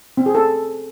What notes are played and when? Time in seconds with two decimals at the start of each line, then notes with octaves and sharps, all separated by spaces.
0.17 C4
0.26 G#4
0.35 A4